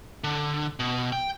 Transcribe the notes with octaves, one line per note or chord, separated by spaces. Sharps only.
D3
B2
G5